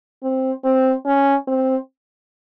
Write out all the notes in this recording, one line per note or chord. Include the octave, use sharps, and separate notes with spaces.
C4
C4
C#4
C4